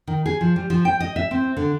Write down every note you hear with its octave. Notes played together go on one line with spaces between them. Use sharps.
D#3
G#4
F3
G3
F3
G5
D#5
E5
C4
D3